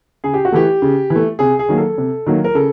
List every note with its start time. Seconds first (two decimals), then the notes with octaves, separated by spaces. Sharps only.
0.24 C#3 G#4
0.34 G4
0.45 F#4
0.52 E3 A3 G4
0.82 C#3
1.10 E3
1.16 A3
1.39 C3 G#4
1.59 G#4
1.69 D#3 F#3 A#3
1.78 A4
1.98 C3
2.26 D#3 F#3 A#3
2.44 A#4
2.55 C#3 A4